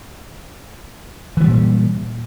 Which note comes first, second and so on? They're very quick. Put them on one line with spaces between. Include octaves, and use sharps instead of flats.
E3 F3 G3 A#2